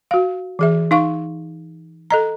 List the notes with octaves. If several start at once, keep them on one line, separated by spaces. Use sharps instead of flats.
F#4 F5
E3 G#4 E5
D#4 F5 C#6
A4 D#5 A#5